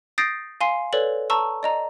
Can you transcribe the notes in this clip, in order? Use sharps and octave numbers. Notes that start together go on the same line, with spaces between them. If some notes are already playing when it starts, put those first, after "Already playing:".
D#6 G6 A6 A#6 C7 D7
F5 G#5 C6 C7
A4 B4 C#5 D5 F#7
A5 A#5 C#6 E6
D5 D#5 A#5